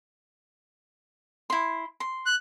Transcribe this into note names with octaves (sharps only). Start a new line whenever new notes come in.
E4 C6
C6
F#6